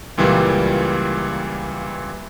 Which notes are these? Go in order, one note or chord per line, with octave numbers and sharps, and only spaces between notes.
C#2 A#2 E3 G3 A#3